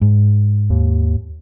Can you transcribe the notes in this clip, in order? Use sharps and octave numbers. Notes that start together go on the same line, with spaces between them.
G#2
D#2